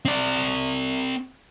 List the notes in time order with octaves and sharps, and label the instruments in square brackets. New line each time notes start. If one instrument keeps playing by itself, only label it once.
[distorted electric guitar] C4 D5